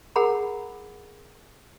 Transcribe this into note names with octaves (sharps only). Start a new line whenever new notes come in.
G#4 A#4 F#5 A#5 B5